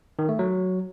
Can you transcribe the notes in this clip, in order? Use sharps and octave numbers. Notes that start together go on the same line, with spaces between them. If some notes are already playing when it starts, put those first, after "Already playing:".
D#3
A3
F#3